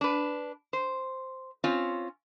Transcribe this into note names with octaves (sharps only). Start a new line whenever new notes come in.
D4 B4
C5
C4 C#4 F4